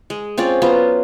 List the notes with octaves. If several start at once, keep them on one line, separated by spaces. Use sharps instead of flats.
G#3
C4 C#4 F4 D5
F#3 B3 F4